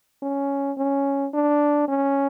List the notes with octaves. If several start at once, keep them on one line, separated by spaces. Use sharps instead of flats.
C#4
C#4
D4
C#4